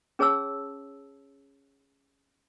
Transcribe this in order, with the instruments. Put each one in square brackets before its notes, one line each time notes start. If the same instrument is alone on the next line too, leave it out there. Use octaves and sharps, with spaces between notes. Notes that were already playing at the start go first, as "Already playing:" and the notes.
[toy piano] C#4 G#4 C#5 A5 E6